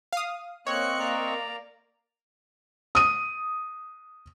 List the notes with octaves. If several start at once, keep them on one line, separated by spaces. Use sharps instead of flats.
F5 D#6
A#3 C4 C#5 D#5 C#6 F#6 C#7
A#3 D5 A#5
D#6 D#7